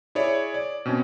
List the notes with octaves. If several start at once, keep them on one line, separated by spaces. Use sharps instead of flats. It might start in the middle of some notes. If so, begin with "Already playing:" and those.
E4 G#4 C#5 D5
D5
B2 C4 C#4